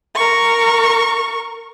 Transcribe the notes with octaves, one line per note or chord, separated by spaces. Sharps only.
A#4 C#6